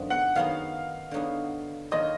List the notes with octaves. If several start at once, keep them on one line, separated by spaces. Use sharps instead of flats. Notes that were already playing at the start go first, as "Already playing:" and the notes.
Already playing: F#2 D3 F3 B3 D#4
F#5
D#3 F#3 B3 D#4 G#4 F5
D3 F#3 B3 D#4 G#4
D#3 F#3 A#3 F4 G#4 D#5